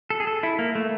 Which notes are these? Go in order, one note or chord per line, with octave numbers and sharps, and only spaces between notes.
A4
G#4
A4
E4
A#3
A3